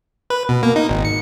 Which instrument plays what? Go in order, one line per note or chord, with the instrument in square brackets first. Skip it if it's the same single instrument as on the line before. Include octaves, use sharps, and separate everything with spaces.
[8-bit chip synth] B4
B2
A#3
D#4
G#1
C#7